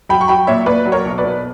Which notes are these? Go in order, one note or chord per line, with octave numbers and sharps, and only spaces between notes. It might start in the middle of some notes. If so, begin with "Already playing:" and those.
F#3 G5 B5
C#6
F#3 G5 B5
A#2 C#5 E5
A#2 B4 D5
F#3
A#4 C#5
B1
B4 D5
B1